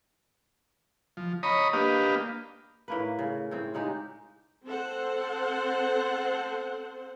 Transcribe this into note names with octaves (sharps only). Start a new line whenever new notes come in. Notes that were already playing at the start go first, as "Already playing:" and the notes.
F3
C#5 D#5 A#5 B5 D#6
A#3 D4 G4 B4 D#5 F5
A2 A#3 B4
C#3
A2 C4
C#3 G#3 D#4 G4
C4 A4 C5 F#5